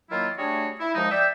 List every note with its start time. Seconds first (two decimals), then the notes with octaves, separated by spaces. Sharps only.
0.10 D#3 F#3 A#3 E4 F4
0.38 G3 A3 D4 F#4 G#4 C#5
0.80 E4
0.95 D#2 F3 G#3 D#4
1.11 D5 E5 G5